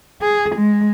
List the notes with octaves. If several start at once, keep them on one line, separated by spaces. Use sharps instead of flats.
G#4
G#3